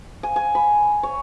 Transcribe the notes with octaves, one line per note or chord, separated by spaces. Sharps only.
G#5
G#5
B5
C#5